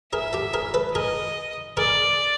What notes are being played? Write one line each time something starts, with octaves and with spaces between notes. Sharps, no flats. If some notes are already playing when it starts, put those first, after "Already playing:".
G#4 A#4 E5
G4 A4
G#4 A#4
A4 B4
G#4 A#4 D#5
G#4 A#4 D5